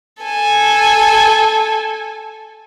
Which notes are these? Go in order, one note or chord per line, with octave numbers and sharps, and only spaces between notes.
A4 G#5